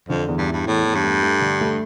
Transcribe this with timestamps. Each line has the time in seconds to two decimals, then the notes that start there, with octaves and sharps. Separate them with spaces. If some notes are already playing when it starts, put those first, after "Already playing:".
0.09 F2 D3
0.28 E2
0.37 G2
0.48 G2 E4
0.66 E2 A2
0.84 E2
0.94 G2
1.04 A3
1.23 A3
1.41 D3
1.61 A3